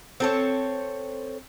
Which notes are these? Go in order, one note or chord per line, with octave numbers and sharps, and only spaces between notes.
C4 A4 C#5